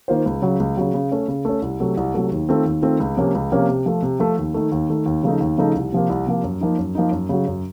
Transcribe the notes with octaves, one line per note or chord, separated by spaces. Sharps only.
D#3 A#3 F4 C5
C#2
C#3 F#3
C#2
C#3 F#3
C#3
A3 C#4
C#3
A3 C#4
C2
C3 F#3 A3
C2
C3 F#3 A3
D#2
D#3 A3 C4 F4
D#2
D#3 A3 C4 F4
C#2
C3 F3 A#3 C#4
C#2
C3 F3 A#3 C#4
C3
F3 A3
C3
F3 A3
D#2
D#3 A3
D#2
D#3 A3
D#2
C#3 F3 A3 D#4
D#2
C#3 F3 A3 D#4
C2
C3 F3 A#3
C2
C3 F3 A#3
F#2
F3 A#3 D#4
F#2
F3 A#3 D#4
F#2
C#3 F#3
F#2